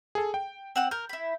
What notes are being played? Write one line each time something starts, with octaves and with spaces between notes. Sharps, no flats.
G#4 A4
G5
C4 F#5 E6
A#4 G6
E4 B5